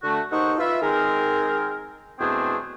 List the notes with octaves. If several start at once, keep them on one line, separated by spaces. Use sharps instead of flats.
D3 A3 F#4
D#2 D#4 A4 C5 F#5 C#6
F4 B4 E5
D#3 G#3 C4 G#4 A#4
E2 B2 A3 C4 D4 G#4